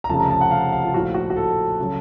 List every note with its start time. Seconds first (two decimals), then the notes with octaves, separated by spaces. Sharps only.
0.04 A#5
0.09 F1 F2 C#3 F3 A5
0.20 A#5
0.31 A5
0.41 F#5
0.51 F5
0.72 F5
0.84 F4
0.94 A#1 A2 F3 F#4
1.14 F#4
1.30 F#4
1.36 A4
1.80 C#3 F#3